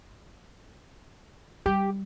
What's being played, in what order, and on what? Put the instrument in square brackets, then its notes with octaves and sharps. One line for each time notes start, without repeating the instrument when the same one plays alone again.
[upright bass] G3 [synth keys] G4